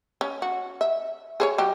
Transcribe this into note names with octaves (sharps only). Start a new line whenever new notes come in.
C#4
F#4
E5
G#4 C5 C#5
F#3 G4